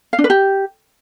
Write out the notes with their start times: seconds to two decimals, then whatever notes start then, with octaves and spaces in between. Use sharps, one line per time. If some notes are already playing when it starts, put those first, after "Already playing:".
0.13 F5
0.19 D4
0.24 B4
0.30 G4